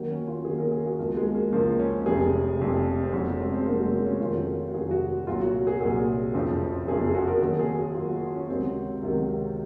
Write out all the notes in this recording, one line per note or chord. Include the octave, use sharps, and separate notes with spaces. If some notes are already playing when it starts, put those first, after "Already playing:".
Already playing: D#2 D#3 F#3
C#4
F4
D#2 D#3 F#3 G#4
A#4
G#4
F#4
C#2 C#3 F3 A#3
G#3
A#3
C#2 C#3 F3 A#3
C#4
F1 F2 C3 G#4
F1 F2 C3
C4
F1 F2 C#3 F#3 C#4
G#3
C4
F1 F2 C#3 F#3 A#3
G#3
A#3
C#4
F2 C3 D#3 F#3 F4
F#4
F2 C3 D#3 F#3 G#4
F#4
C2 A#2 F#3 F4
F#4
G#4
C2 A#2 F#3 G#4
F#1 F2 C#3 F3
F#1 F2 C#3 F3 G#4
G#4
F#4
A#4
D#2 D#3 F#3 A#4
G#4
F#4
D#2 D#3 F#3 F4
F#4
F4
C#4
C#2 C3 D#3 F#3 C4
C#2 C3 D#3 F#3